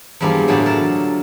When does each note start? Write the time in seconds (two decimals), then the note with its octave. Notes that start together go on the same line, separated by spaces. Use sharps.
0.20 E2 G2 F3 G3 A#3 F5
0.47 A2 D3 F#3 G#4 D5 A5
0.66 A#4 A5